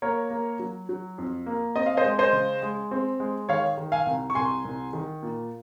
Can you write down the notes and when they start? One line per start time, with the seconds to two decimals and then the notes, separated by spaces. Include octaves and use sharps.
0.02 A#3 A#4 C#5
0.31 A#3
0.59 F#3
0.89 F#3
1.18 F2
1.46 A#3
1.76 C4 D#5
1.86 F5
1.97 C5 D#5
2.04 G#3
2.19 C5 D#5
2.33 C#3
2.62 G#3
2.91 C4
3.20 G#3
3.49 D#3 C#5 F5
3.78 D#3
3.92 F5 G#5
4.06 C2
4.30 C#6
4.35 C2 G#5 C6
4.65 C2
4.93 D#3
5.23 A#2